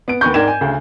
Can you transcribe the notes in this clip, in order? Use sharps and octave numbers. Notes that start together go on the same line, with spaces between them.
B3 D7
D#2 B3 B4 C#6 G6
G#2 A#4 D5 G5 G#6 E7
G#5
D2 C#3